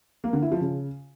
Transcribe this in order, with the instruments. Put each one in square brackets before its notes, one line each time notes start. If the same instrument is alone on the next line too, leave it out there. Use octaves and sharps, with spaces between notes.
[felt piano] A#3
D3
E4
F3
C#3